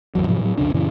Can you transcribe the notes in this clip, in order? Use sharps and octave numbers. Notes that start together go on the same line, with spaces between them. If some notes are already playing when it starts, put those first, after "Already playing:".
G#1 E2 F#3
G#2 C3 F3 F#3
A2 F#3
C2 F2 C#3 D4
F#2 A#2 C#3 E3